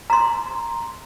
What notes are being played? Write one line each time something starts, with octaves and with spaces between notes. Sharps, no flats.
A#5 C6